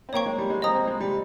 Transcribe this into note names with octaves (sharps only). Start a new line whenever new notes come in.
C4
A#3 C#5 G5 C#6
G#3
G3
G#3
C4 D#5 A#5 D#6
C4
G#3
G3